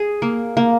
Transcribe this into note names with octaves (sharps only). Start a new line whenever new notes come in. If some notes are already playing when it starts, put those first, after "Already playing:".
Already playing: G#4
A#3
A#3